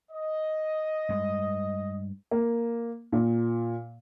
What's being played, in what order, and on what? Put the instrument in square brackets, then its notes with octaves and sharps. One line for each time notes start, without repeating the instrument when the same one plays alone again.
[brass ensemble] D#5
[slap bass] G2 G#3
[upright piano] A#3
A#2